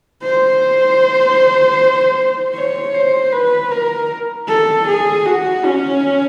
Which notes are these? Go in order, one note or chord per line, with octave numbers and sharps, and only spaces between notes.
C5
C#5
C5
B4
A#4
A4
G#4
F#4
C#4